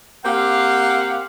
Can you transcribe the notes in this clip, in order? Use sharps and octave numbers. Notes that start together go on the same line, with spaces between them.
A#3 C4 G4 F5 F#5